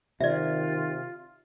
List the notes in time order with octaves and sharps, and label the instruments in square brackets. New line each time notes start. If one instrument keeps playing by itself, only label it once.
[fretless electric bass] C3 [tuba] D#3 [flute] F4 [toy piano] D5 E5